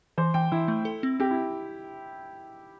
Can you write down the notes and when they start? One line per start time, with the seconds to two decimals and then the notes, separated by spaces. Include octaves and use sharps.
0.18 E3 C5
0.34 E3 G5
0.52 E3 E4
0.68 A3
0.85 A4
1.03 C4
1.20 C4 G4
1.31 E4